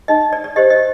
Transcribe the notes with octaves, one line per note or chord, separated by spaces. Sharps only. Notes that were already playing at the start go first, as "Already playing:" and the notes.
D#4 D#5
D5
D5
G4 C5 D#5
D#5